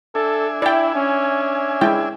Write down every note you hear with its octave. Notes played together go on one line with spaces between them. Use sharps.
D4 A4 E5 G#5
E4 D5 G5
C#4
G#3 E4 G5